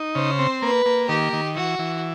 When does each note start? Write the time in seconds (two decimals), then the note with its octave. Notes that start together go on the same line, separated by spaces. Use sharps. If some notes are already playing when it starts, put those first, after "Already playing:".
Already playing: D#4
0.15 C#3 C5
0.39 C4
0.62 A#3 B4
0.86 A#3
1.08 D#3 G4
1.33 D#3
1.56 E3 F#4
1.79 E3